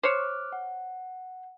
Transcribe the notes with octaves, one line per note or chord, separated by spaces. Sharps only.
C5 C#5 D6 F6 F#6
F#5